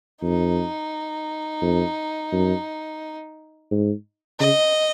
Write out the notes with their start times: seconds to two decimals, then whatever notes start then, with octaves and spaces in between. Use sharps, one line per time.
0.22 F2 D#4
1.61 F2
2.32 F#2
3.71 G#2
4.40 C#3 D#5